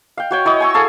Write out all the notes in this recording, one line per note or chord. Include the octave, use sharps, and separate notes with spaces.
F5 G5
F#4 C#5 G5
E4 C#5 D#5
G#5 C#6 E6
G#4 A4 F5 G#5